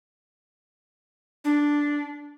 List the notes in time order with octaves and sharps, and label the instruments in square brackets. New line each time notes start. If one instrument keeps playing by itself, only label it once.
[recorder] D4